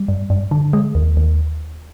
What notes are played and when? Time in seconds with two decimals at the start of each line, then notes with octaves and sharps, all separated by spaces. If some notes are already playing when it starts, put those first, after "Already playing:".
Already playing: G3
0.08 G2
0.30 G2
0.51 D3
0.73 G#3
0.95 D#2
1.17 D#2